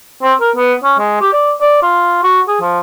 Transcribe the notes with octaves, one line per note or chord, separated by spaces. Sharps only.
C4
A#4
B3
C#4
G#3
G4
D5
D5
F4
F#4
G#4
F3